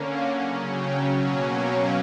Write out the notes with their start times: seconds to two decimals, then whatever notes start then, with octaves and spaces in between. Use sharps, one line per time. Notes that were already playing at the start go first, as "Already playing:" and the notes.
Already playing: D3 A#3 C#4
0.28 C#3 F#3 C#4 F#5
0.70 G5
1.12 B2 F#3 A#3 C#4
1.53 G5